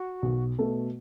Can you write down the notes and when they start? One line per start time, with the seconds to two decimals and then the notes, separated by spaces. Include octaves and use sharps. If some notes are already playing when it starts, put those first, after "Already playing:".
Already playing: F#4
0.22 B1
0.58 B2 A3 F#4 A4